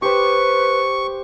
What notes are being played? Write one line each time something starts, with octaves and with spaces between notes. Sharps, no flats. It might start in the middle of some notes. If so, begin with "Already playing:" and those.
G4 B4 C5 C#6